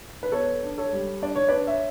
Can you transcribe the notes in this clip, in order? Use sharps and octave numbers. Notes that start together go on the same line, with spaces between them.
B4
B3 A4 C#5
D4
A4 C#5
G3
D4 D5
C#5
D4 B4 D5
C#5 E5